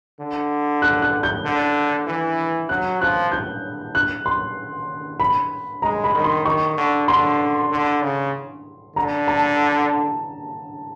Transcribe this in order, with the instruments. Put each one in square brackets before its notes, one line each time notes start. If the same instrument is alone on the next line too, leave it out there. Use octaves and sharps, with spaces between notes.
[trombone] D3
[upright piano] F#6
F#6
G6
[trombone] D3
E3
[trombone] F#3 [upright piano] F#6
[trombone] F3 [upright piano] F#6
[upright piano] G6
F#6
C6
B5
[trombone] G#3 [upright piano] A#5
[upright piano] B5
[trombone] D#3
[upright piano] C6
[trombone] D#3 [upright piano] C#6
[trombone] D3
[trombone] D3 [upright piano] C6
[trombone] D3
C#3
[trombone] D3 [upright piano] A#5
[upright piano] A5